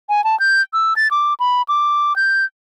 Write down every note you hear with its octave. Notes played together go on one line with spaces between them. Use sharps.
G#5
A5
G6
E6
A6
D6
B5
D6
G6